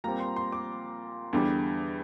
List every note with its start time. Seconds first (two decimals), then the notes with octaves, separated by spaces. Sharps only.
0.04 A#2 G3 C4 A#5
0.20 C6
0.36 C6
0.52 D6
1.33 E2 D3 G3 D4